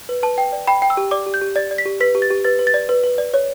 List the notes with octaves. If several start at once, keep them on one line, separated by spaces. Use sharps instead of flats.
B4
B4 A5
G5
D5
G5 B5
G5
E6
G4
D5 D6
G4
G6
G4
D5 A6
D5
B6
G4
B4 B6
G4
A6
G4
B4 A6
B4
A6
D5
B4
B4
D5
C#5